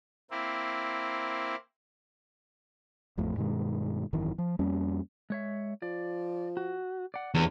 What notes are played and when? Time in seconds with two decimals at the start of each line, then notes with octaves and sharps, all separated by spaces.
0.31 A#3 C4 E4
3.18 A1 F2 A2
3.37 G2 B2 D#3 G#3
4.13 G#1 F#2 D#3 E3
4.38 F3
4.59 F2 G3 A#3 C#4
5.30 G#3 C#5 E5
5.82 F3 D5
6.57 F#4
7.14 D5 F#5
7.34 F1 E2 C#5